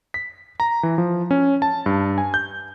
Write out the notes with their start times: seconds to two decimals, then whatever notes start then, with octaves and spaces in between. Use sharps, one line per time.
0.14 B6
0.60 A#5
0.83 E3
0.98 F3
1.31 C#4
1.62 A5
1.86 G2
2.18 G#5
2.34 G6